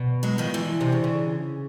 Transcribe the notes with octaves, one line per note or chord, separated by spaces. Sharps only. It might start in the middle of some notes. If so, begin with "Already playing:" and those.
Already playing: B2
F#3 G#3
D#3 F3
D3 E3
C3
C#3
C#3